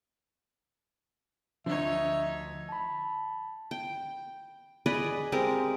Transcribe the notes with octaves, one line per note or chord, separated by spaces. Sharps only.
D2 D3 F3 D#4 C#5 E5
A5 B5
G5
G#4 B4 D5 D#5
G#3 C4 G4 A#4